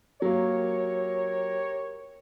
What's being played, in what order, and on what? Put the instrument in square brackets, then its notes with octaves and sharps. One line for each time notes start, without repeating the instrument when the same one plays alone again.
[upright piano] F#3 A#3 [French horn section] G4 A#4 C#5